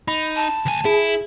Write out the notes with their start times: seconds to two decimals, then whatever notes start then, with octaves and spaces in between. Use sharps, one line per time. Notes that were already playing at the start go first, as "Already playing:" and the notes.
0.08 D#4 B5
0.36 A5
0.66 D2 G#5
0.85 E4 G#4